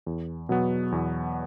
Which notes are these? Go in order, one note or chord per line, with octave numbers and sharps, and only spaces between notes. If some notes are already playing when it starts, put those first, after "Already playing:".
E2
B2 F#3 B3
E2